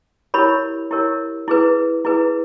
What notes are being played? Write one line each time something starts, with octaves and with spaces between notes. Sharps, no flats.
E4 G4 A#4 C#5 B5
E4 G4 A#4 C#5
E4 G#4 B4
E4 G#4 B4